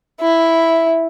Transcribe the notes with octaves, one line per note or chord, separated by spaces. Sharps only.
E4